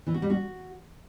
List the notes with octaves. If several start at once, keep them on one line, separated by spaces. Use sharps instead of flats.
E3
F#4
G3
F#4